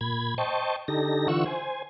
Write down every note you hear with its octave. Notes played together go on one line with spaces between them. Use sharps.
A#2 B5 G#6
C5 D#5 G5 A5 C#6
D3 D#4 G4 A4 A#6
D3 E3 F4 F#5 C#6 E6
C5 G#5